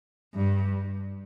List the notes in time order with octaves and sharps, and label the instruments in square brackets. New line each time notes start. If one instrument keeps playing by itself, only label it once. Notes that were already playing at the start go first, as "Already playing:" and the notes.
[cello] G2